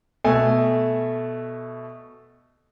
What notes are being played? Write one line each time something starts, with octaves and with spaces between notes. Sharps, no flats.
B2 A3 G#5